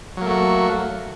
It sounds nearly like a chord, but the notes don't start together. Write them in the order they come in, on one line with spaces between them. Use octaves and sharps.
F#3 A#3 A3 F#4